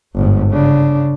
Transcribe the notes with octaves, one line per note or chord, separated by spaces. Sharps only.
G1 G#2
C#3 D4